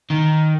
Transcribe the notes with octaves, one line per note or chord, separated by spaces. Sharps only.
D#3